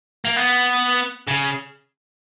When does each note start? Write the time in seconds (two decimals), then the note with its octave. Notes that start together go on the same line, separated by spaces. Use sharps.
0.25 A#3
0.36 B3
1.27 C#3